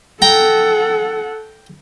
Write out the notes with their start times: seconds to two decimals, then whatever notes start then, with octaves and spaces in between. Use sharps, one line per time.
0.22 A4 F#5 G5 A#5